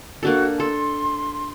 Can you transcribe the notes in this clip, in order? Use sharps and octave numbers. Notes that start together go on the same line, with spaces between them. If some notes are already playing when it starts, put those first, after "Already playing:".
A#3 D4 F#4 A4
A4 C6